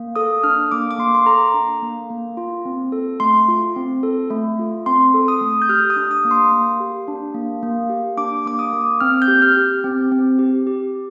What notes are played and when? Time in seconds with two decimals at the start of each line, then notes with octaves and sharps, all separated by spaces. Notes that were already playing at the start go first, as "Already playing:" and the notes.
Already playing: A#3
0.16 A4 D#6
0.44 D4 F6
0.71 A#3 D6
0.91 D6
0.98 A#3 C6
1.15 C6
1.26 A4 A#5
1.54 D4
1.82 A#3
2.10 A#3
2.37 F4
2.65 C4
2.92 A4
3.20 A3 C6
3.48 F4
3.76 C4
4.03 A4
4.30 A3
4.59 F4
4.86 C4 C6
5.14 A4
5.28 D#6
5.41 A3
5.62 G6
5.69 G4 F6
5.90 D#6
5.96 D4
6.11 D#6
6.24 A#3
6.31 C6
6.52 A#3
6.80 G4
7.08 D4
7.34 A#3
7.63 A#3
7.90 G4
8.17 D4 D6
8.46 A#3 D6
8.59 D#6
8.73 A#3
9.00 C4 F6
9.22 G6
9.28 G4
9.42 F6
9.57 G4
9.84 C4
10.12 C4
10.39 G4
10.67 G4